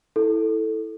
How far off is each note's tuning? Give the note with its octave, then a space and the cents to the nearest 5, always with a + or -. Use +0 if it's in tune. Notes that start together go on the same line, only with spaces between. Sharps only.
E4 -10 A4 +0